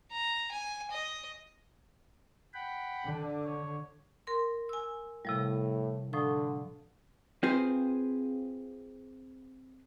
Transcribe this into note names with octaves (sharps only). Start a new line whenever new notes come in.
A#5
G#5
D#5
F#5 G5 B5
D3
C#5
A#4 C6
G#5 E6
A2 C3 F3 G3
A2 D3 F3 D#6
C4 F4 G#4 B4 C5